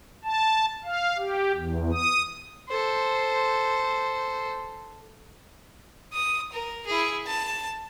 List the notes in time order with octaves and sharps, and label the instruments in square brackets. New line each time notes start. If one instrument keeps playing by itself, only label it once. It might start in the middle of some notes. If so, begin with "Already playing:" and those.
[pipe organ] A5
F5
G4
E2
D#6
[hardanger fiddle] A4 C5
[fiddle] D#6
A#4
E4 G#4
A5